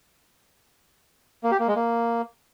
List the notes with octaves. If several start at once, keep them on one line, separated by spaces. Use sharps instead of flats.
A#3
G4
A#3
G#3
A#3